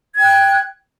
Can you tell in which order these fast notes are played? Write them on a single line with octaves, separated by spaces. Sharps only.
G#6 G5 F#6